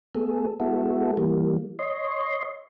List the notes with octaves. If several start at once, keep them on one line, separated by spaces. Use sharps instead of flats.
A3 B3 G#4 A4
G#3 B3 E4 F#4 A4
E3 G3 A#3
C#5 D#5 C6